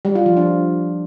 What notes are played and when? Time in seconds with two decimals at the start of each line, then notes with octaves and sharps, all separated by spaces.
0.05 G3
0.15 F4
0.26 F3
0.37 D4